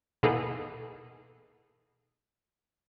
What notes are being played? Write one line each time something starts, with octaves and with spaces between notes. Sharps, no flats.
B2 E3 A#3 D#4 G#4 A4